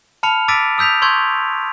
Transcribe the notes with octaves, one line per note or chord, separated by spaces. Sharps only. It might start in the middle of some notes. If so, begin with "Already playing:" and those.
A5 B5 F6 C#7 F7
D6 E6 A6 B6 D7 D#7
D#6 E6 G6 B6 F7
C6 C#6 E6 G6 G#6